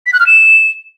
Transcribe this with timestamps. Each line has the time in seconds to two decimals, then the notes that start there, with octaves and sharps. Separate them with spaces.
0.06 B6
0.13 F#6
0.20 F6
0.27 E7